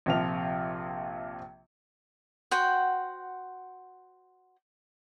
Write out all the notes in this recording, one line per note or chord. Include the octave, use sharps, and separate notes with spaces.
A#1 C3 F3 F4 F7
F#4 C5 F#5 G5